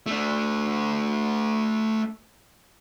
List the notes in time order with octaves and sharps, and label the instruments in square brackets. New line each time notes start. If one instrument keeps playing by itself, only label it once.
[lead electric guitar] A3 D4